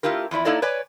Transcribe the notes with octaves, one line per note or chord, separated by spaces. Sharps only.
A3 E4 F4 G4 A#4
E2 F3 E4 D5
A#3 D#4 E4 A4 D5 D#5
B4 C#5 D5 G#5